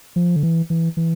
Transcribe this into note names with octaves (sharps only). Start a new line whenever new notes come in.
F3
D3
E3
E3
E3